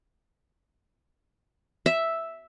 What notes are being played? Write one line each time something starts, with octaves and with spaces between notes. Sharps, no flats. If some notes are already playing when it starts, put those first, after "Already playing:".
E5